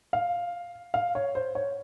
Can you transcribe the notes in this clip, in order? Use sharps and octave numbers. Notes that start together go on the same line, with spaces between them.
F5
F5
C#5
C5
C#5